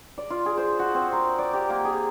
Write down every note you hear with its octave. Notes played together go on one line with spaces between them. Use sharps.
D5
F4
G#4
C5
F#4
C4
A#4
D5
G4
A#3
G#4